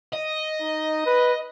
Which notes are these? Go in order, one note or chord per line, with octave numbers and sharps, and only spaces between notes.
D#5
D#4
B4